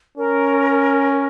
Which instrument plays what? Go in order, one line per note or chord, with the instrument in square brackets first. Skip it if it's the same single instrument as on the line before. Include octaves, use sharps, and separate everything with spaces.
[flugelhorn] C#4 [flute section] A#4